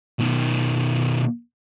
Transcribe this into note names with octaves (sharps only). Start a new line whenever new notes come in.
B2 D#3